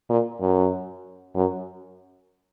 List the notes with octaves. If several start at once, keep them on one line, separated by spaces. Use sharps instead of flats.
A#2
F#2
F#2